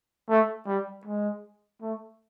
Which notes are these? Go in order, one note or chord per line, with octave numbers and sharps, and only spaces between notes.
A3
G3
G#3
A3